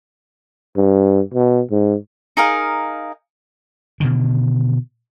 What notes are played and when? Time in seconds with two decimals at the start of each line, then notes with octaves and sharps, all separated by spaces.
0.77 G2
1.34 B2
1.71 G#2
2.37 D#4 G#4 A#4 F5
4.00 B2 D3 D#3